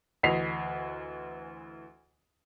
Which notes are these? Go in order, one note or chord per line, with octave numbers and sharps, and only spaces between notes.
D2 E3 D#5 B6 C7 F7